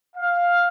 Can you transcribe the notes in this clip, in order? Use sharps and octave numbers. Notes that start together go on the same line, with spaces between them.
F5